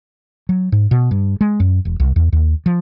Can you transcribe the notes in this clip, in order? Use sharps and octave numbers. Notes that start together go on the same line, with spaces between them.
F#3
G#2
B2
G2
G#3
F#2
E1
C2
E2
D#2
F3